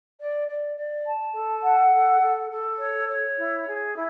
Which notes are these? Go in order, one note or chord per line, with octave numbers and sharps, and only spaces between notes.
D5
D5
D5
A5
A4
F#5
A4
A4
A4
C#5
C#5
E4
G#4
E4